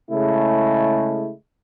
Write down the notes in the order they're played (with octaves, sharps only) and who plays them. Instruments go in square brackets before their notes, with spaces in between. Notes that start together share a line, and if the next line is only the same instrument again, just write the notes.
[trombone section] C#3 G#3 A3 E4